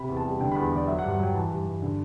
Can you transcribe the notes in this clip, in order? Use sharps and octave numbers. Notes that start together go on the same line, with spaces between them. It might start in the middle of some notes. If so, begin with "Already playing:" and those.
Already playing: C3 B5
E2
A5
G3
D3 G5
B5
E2
B5
E2 D5
F#3 E5
F#5
G2
F#5
F#3 G5
E3 A5
G2
G2
D3